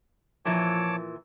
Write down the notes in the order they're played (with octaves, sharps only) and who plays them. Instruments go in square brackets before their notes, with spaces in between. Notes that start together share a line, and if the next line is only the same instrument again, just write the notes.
[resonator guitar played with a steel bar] A#2 E3 [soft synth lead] F3 [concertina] C#5 A5 D6